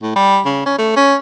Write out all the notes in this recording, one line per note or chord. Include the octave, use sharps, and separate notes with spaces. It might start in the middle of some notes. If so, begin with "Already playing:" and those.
A2
G3
C#3
C#4
A3
C#4